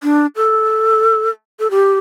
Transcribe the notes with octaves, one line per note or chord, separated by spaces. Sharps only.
D4
A4
A4
G4